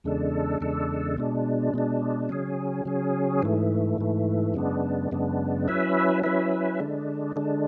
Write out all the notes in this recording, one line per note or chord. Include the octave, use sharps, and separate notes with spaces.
E2 C#3 G#3 D4 A4
E2 C#3 G#3 D4 A4
B2 G#3 D4
B2 G#3 D4
C#3 F#3 C#4 G#4
C#3 F#3 C#4 G#4
G#2 E3 A3
G#2 E3 A3
F#2 C#3 G#3 B3 D4
F#2 C#3 G#3 B3 D4
F#3 C#4 E4 B4 E5
F#3 C#4 E4 B4 E5
D3 G#3 D4
D3 G#3 D4